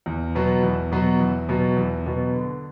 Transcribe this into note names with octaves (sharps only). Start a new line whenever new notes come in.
E2
B2 F#3 B3 F#4
E2
B2 F#3 B3 F#4
E2
B2 F#3 B3 F#4
E2
B2 F#3 B3 F#4
D3